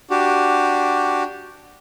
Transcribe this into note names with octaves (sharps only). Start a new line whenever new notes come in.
D4 F#4 G4